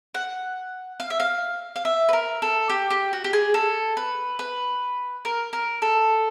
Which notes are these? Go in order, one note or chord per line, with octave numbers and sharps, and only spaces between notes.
F#5
F5
E5
F5
F5
E5
B4
A#4
A4
G4
G4
F#4
G4
G#4
A4
B4
B4
A#4
A#4
A4